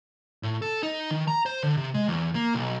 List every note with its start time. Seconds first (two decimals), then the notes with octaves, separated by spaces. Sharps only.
0.43 A2
0.62 A4
0.83 D#4
1.11 D#3
1.28 A#5
1.46 C5
1.63 D3
1.77 C3
1.94 G#3
2.08 E2
2.35 A#3
2.55 B1